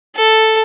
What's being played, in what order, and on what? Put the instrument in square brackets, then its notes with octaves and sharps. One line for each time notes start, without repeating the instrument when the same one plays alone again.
[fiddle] A4